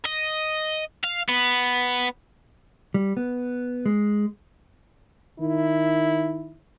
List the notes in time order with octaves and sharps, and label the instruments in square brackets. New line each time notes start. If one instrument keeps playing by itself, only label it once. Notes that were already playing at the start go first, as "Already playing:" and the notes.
[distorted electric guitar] D#5
F5
B3
[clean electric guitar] G3
B3
G#3
[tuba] D#3 [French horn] E4